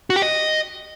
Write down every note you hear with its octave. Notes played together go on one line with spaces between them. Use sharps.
F#4
G4
D#5